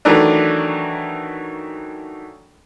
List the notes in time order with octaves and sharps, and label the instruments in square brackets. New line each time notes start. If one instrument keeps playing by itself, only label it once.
[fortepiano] D#3 E3 F#3 A3 D4